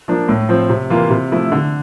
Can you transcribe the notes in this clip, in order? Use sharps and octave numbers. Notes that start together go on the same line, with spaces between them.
F3 A#3 D4
A2
F3 C4
C3
E3 A#3 F4
C3
F3 A3 E4
D3